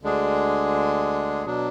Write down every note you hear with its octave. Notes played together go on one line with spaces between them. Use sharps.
D2 D3 G#3 D4 G#4
B2 F#3 D4